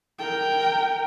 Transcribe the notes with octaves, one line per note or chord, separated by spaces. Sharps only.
A#4 G5